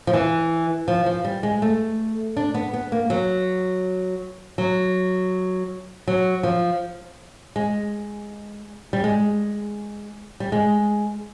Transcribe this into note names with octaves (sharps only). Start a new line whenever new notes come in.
F3
E3
F3
F3
G3
G#3
A3
D4
B3
B3
A#3
F#3
F#3
F#3
F3
G#3
G3
G#3
G3
G#3